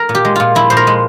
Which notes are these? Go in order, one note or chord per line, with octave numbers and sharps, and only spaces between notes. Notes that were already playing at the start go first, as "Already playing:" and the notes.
Already playing: A#4
A#2
G4
G#3
A#2 F4
F3 E4
A#2 C5
A#4
G#3